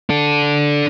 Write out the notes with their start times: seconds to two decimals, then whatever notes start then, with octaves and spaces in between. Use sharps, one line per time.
0.10 D4 A4